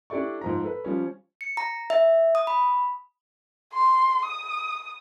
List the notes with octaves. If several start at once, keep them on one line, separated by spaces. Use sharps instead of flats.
D4 E4 G4 A4 D5 C#6
G#2 F3 A#5
A4 B4
F3 G3 C#4
C#7
A#5
E5
D#6
B5
C6
D#6